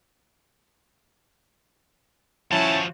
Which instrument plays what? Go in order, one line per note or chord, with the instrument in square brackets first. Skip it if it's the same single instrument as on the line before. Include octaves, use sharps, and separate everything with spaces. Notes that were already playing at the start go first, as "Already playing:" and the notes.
[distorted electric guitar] F3 F#4 [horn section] C#4 E4 A5